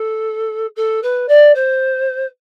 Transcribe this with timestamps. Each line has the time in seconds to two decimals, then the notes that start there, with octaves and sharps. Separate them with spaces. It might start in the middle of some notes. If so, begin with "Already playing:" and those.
Already playing: A4
0.76 A4
1.02 B4
1.28 D5
1.55 C5